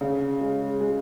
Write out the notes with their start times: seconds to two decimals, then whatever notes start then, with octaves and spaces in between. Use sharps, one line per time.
0.01 C#3
0.41 G#3
0.80 G#3